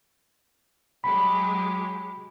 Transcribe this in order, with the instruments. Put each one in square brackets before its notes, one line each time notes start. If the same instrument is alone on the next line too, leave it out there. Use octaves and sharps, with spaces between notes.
[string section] F#3 G#3 G4 [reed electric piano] B5